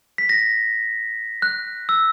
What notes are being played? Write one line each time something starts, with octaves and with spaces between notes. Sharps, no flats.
B6
A#6
F#6
E6